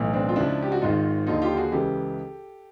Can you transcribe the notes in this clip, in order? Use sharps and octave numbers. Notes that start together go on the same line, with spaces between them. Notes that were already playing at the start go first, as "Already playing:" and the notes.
Already playing: B1 A2 E3
C4 D4
F4
C#2 C#3 F3 D4 E4
G4
F#4
G#1 G#2 D#3 D#4 F4
D#2 D3 F3 D#4 F4
F4 G4
F#4 G#4
C#2 C#3 E3 G4 A4